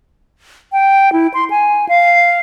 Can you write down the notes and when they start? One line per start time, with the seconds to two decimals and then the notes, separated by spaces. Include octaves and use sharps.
0.72 G5
1.13 E4
1.34 C6
1.50 G#5
1.89 F5